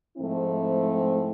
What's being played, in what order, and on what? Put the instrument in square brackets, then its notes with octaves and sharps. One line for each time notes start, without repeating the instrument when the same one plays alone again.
[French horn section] G#2 F3 A3 C4 E4